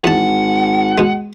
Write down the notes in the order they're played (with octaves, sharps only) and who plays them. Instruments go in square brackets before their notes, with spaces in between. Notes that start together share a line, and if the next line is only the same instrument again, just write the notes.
[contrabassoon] G#1 [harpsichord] E2 A5 [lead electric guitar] F#5
[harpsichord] B2 G#3